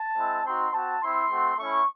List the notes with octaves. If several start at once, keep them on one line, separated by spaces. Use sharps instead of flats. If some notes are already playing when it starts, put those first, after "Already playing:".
Already playing: A5
G#3 C4 E4
C4 D#4 F#4 C6
C4 F#4 A5
C4 E4 C6
A3 C4 F#4
A3 C#4 E4 C#6